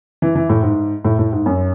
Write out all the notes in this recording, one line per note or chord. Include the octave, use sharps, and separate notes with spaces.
E3
E3
A2
G#2
A2
A2
G#2
F#2